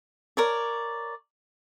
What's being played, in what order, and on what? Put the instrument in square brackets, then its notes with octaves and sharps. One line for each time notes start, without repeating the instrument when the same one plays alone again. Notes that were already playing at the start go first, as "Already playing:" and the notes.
[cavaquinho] A#4 C#5 D5